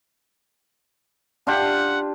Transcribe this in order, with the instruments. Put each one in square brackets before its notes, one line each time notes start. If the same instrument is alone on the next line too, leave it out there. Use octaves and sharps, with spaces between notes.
[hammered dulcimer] D4 F4 G4 [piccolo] F#5